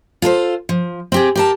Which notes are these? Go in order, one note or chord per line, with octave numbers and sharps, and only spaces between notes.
F4 A4 A#4 C5
F3
C4 G4 G#4
G4 A#4 A5